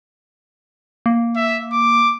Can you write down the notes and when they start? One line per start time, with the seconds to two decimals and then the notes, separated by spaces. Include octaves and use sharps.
1.06 A#3
1.36 E5
1.72 D6